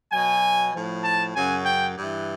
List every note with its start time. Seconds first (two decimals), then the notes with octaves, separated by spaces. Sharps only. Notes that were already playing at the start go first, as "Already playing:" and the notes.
0.13 B2 F#3 G#5
0.74 A2 F3
1.04 A5
1.35 F#2 C#3 F#3 G#5
1.65 G5
1.96 G2
2.01 E3